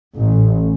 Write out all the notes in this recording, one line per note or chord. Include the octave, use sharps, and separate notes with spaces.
A1